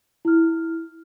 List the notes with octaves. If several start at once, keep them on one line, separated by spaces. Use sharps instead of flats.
E4 F6